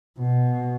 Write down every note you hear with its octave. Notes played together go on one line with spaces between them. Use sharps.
B2